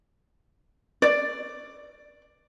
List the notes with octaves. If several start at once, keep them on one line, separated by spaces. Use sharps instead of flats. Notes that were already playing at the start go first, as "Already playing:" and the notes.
D5